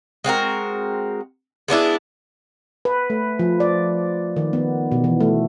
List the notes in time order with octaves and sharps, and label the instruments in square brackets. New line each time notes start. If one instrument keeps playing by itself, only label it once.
[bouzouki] G#3 C4 F#4 A#4
G#3 B3 D4 E4
[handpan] B4
A3
F3
D5
D#3
B3
B2
E3
A3